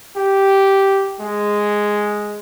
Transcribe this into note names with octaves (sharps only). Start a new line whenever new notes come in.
G4
G#3